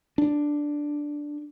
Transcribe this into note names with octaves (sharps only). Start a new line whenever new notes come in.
D4